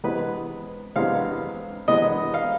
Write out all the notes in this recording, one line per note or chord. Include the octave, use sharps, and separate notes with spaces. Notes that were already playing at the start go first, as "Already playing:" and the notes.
C3 E3 G#3 B3 B4
C3 E3 G#3 B3 F5
C3 E3 G#3 B3 D#5
F5